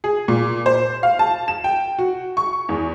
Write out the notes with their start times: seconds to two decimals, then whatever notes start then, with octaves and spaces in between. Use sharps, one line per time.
0.04 G#4
0.28 A#2
0.66 C5
1.03 F5
1.19 A5
1.48 E7
1.64 G5
1.99 F#4
2.37 C#6
2.69 E2